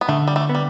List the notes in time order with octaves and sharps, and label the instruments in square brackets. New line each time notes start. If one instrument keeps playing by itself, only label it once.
[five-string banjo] B3
[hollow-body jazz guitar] D3 [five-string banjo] A3
[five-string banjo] G3
A3
[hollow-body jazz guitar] B3
[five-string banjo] G3